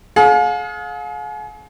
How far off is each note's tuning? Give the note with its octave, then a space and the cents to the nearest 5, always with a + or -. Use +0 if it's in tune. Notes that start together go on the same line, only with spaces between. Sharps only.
G#4 +35 F5 +40